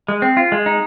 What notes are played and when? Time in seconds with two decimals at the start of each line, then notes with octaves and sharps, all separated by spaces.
0.08 G#3
0.22 C4
0.37 F4
0.52 G#3
0.66 D#4